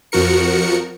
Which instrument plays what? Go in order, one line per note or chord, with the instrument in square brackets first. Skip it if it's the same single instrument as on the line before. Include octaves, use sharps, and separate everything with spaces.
[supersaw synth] F2 F3 F#4 A#4 C#7